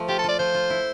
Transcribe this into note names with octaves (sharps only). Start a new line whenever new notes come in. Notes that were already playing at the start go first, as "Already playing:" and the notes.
Already playing: F3 A3
F4 G4
A4
F4 D5
F3 C5
F4
E4